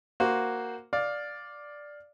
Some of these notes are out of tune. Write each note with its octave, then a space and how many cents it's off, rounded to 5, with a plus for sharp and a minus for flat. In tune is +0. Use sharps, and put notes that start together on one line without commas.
A#3 +0 F#4 +0 C5 +0
D5 +0 F5 +15